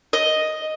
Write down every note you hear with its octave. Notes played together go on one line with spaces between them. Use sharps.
D#5